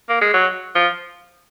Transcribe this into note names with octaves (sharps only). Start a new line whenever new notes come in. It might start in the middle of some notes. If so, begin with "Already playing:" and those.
A#3
G#3
F#3
F3